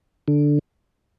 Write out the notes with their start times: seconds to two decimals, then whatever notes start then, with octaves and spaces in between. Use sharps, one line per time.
0.28 D3